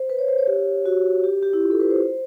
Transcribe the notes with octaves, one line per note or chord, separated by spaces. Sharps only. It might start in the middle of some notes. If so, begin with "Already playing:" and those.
Already playing: C5
B4
C#5
C5
C#5
G4
F#4
G4
G4
E4
F4
A4
B4
C5